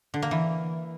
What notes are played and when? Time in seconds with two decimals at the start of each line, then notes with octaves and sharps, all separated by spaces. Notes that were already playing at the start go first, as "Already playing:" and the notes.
0.14 D3
0.22 A#3
0.31 E3